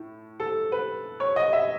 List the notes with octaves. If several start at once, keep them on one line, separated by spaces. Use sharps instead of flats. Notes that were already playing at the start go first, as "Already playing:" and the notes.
Already playing: A2
A4
B4
C#5
D#5
E5